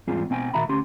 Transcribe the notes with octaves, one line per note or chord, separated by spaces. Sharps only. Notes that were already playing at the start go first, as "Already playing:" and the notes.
E2 G#2 G3 C4 F4 G#4
B2 C4 G5 G#5
A#2 D#3 F#4 E5 A#5 B5
D2 C#4 G4 C6